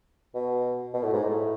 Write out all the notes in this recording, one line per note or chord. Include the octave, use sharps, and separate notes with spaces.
B2
B2
A2
G#2
A2